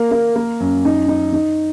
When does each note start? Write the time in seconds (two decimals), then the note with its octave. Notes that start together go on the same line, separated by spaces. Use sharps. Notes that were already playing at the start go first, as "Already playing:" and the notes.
Already playing: A#3
0.11 A#3
0.36 A#3
0.60 F#2
0.85 D#4
1.08 D#4
1.33 D#4